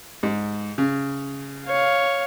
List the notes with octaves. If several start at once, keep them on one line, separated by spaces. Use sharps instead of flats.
G#2
C#3
C#5 F5